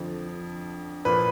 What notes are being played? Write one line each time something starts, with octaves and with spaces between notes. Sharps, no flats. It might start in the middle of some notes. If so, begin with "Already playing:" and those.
Already playing: F2 D3 F3
A#2 F3 A#3 B4